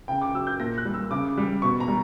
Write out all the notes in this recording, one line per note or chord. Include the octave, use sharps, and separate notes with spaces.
C#3 G5
D6
F#3 E6
G6
A#2 A#6
F#6
G3
E6
C#3 D6
G3
B2 C#6
A#5
G3